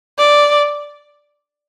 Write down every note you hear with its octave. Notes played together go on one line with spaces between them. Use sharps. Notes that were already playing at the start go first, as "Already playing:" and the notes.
D5